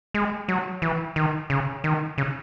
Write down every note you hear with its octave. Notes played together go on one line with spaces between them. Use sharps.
G#3
F#3
E3
D#3
C#3
D#3
C#3